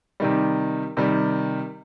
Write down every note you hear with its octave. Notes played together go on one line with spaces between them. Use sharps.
C3 D#3 G3
C3 D#3 G3